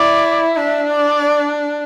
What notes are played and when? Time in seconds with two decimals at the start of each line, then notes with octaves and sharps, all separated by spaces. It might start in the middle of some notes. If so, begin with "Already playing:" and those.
Already playing: E4 D5
0.56 D4 E5
0.92 D5